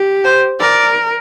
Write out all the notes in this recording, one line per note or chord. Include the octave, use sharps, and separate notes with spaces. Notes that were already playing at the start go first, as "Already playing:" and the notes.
Already playing: G4
C5
A#4 D5